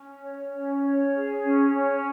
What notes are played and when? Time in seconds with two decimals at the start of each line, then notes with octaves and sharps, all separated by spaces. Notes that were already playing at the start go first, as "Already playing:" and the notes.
Already playing: C#4
0.20 C#5
0.51 C#4
0.81 C#5
1.13 G#4
1.43 C#4
1.74 C#4 C#5